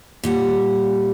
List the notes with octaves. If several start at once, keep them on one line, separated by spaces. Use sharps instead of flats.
A#2 G3 F#5